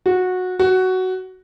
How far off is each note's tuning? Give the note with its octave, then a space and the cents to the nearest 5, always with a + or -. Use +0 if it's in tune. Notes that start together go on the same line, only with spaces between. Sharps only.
F#4 -15
F#4 +10